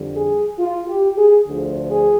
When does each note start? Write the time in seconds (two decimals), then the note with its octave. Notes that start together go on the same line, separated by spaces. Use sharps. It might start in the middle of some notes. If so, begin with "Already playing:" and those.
Already playing: F2 D3 G3
0.16 G#4
0.59 F4
0.88 G4
1.17 G#4
1.46 D2 D3 F3
1.89 G#4